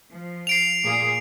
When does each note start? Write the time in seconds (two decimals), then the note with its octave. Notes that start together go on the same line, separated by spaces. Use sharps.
0.11 F3
0.47 C7 D7 F7
0.84 A#2 A#3 G#4